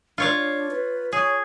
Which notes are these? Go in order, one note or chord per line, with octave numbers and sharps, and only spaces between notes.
D4 F4 C#5 F5
B4
G#4 C#5